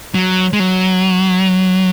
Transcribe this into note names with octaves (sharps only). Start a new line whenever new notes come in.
F#3
G#3
F#3